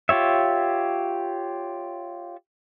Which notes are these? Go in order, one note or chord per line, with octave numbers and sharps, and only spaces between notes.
F4 G4 C#5 E5